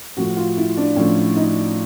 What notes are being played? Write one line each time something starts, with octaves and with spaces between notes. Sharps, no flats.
A2 F3 F#4
F4
E4
D4
A2 F3 C#4
D#4